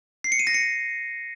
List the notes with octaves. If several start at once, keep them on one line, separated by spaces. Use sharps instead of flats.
C7
C#7
D#7
A#6
C#7